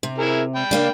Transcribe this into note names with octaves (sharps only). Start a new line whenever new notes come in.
C3
E4 G#4 A#4
G5 B5
C#3 A#3 D4